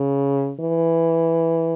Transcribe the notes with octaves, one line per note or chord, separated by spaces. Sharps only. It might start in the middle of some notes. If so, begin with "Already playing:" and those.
Already playing: C#3
E3